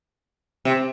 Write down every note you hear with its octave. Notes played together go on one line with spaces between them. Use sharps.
C3